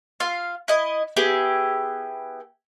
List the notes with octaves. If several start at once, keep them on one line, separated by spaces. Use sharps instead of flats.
F4 F5
E4 D#5
B3 E4 G4 G#4